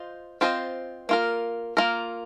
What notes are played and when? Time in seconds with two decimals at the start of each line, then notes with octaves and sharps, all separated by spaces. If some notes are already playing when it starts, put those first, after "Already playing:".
Already playing: F4 C5 D#5
0.41 C4 F4 C5 D#5
1.09 A#3 F4 A#4
1.77 A#3 F4 A#4